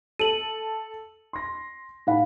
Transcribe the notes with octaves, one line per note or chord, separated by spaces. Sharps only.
A4 D#7 F#7
C6 A#6
A2 D#4 F5 F#5 B5